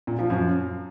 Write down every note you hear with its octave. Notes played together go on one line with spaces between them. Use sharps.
A#2
F3
F#2